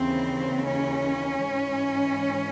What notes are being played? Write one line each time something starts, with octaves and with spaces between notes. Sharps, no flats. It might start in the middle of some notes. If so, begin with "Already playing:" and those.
Already playing: D#2 C#3 E3 C4
C#4
G#2 E3